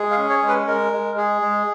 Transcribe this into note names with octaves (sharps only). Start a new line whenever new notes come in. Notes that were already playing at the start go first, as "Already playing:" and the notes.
Already playing: G#3 G#4
F5
C#4
C#5
G#3
B4
G#3 A#4
G#3
G#4
G#3